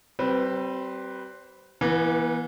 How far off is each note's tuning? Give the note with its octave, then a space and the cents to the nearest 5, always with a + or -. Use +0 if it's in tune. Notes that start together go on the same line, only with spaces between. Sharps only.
G3 -35 C4 +0 B4 +0
E3 +5 B3 -40